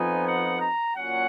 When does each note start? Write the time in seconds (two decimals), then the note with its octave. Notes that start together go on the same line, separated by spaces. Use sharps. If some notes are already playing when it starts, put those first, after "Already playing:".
Already playing: F2 F3 B3 D#4 G#5
0.26 F#5
0.61 A#5
0.95 A#2 F#3 C#4 F#5